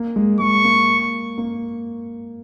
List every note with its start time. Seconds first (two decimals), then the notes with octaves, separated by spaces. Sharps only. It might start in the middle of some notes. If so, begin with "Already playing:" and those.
Already playing: A#3
0.16 G#3
0.39 G#3 C#6
0.64 A#3
1.38 A#3